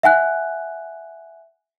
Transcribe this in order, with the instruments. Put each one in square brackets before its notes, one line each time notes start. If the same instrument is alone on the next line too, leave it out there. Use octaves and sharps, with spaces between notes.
[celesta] E5 F#5 G#5 F#6